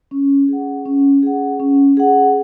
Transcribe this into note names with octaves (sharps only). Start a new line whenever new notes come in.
C#4
G#4 F#5
C#4
G#4 F#5
C#4
G#4 F#5